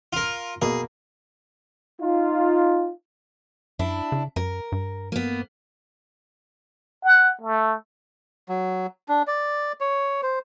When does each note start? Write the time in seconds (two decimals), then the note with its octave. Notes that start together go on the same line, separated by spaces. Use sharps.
0.13 F4 A#4
0.62 B2 A#3 G#4
2.00 D#4 F4
3.79 F#2 D4 E4
4.12 C#3
4.36 F#2 A#4
4.72 G2
5.12 A#3 B3
7.04 F#5
7.41 A3
8.49 F#3
9.08 D4
9.27 D5
9.80 C#5
10.23 C5